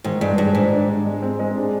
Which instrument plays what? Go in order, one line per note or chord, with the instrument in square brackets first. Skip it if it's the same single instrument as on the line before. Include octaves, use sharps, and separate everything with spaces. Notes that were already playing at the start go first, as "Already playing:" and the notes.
[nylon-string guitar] G#2 [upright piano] D#3
[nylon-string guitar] G2 [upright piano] G#3
[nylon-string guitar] G2 [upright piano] D#3
[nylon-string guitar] G#2 [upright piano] D4
[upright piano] D4
D4
G#3
C4
G#3
D4